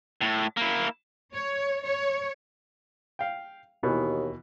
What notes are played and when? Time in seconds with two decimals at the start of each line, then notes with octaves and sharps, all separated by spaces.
0.21 A2
0.57 A#3 E4
1.33 C#5
1.84 C#5
3.19 F5 G5
3.83 D#2 B2 E3